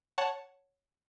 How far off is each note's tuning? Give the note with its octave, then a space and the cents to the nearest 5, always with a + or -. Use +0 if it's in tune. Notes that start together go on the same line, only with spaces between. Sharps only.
C#5 +0 F#5 +0 A5 +0